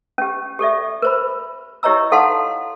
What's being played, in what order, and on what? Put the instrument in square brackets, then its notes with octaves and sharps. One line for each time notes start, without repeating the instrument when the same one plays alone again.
[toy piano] C#4 G4
G4 A4 D5 E5
A#4 C5 B5
E4 G4 C#5 D#5 A#5 E6
D#4 A4 F5 F#5 A5 C6